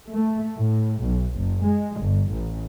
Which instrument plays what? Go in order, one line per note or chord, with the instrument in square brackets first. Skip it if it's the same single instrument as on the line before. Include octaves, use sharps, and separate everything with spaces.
[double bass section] A3
A2
B1
F#1
G#3
G1
A1